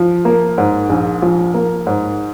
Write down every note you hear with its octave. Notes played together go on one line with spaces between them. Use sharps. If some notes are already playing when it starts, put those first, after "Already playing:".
Already playing: F3
A#3
G#2
A#1
F3
A#3
G#2